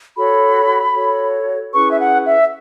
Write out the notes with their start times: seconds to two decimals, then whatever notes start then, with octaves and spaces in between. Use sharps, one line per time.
0.16 F#4 A4 C#5 B5
0.95 F#4 A4 C#5
1.73 C#4 E4 G#4 B4 C#6
1.91 E5
2.00 F#5
2.26 E5